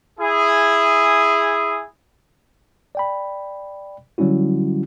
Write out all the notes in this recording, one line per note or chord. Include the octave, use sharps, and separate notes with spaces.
E4 G#4
D5 G5 B5
D3 F#3 G3 C#4 E4 F#4